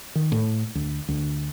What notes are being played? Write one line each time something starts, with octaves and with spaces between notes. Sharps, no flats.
D#3
A2
D2
D2